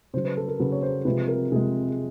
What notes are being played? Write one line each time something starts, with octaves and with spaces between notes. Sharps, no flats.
C#3 F#3 C5
B4
A4
A#4
C#3 F#3 B4
C#5
C5
C3 F3 G#3 B4
A#4
C3 F3 G#3 G#4